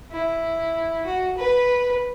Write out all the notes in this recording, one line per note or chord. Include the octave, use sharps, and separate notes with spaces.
E4
F#4
B4